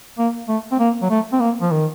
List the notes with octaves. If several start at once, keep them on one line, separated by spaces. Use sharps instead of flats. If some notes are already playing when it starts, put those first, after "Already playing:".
A#3
A3
C4
A#3
F#3
A3
C4
A#3
F3
D#3